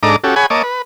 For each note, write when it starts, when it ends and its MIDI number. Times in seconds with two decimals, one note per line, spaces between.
0.03 0.16 44
0.03 0.16 62
0.03 0.16 69
0.03 0.16 75
0.03 0.16 82
0.03 0.16 86
0.24 0.35 61
0.24 0.35 66
0.24 0.35 67
0.24 0.35 69
0.36 0.46 68
0.36 0.46 73
0.36 0.46 78
0.36 0.46 80
0.36 0.46 83
0.50 0.62 58
0.50 0.62 73
0.50 0.62 75
0.50 0.62 81
0.50 0.62 86
0.63 0.82 71